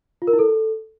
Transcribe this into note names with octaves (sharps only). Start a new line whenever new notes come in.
F4
A#4
E4
A4